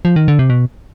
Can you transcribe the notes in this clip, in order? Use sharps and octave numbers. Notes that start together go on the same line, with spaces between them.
F3
D#3
D3
C3
B2